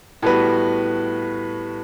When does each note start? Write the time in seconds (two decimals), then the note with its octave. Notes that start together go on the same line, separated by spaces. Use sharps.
0.22 A2 G3 B3 F#4 B4